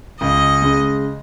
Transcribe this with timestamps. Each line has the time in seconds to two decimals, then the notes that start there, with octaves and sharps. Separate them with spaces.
0.21 C#2 D#5
0.62 C#3 G#3